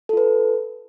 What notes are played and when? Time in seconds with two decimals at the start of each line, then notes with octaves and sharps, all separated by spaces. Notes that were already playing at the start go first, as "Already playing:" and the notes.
0.09 A4
0.13 F4
0.17 B4